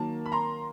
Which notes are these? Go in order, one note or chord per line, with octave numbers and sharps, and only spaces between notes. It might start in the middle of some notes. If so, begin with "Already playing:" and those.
Already playing: D#3 F#3 A#3 A5
B5
A#5 C6